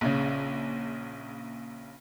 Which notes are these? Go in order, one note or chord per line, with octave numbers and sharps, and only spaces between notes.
A#1 C#3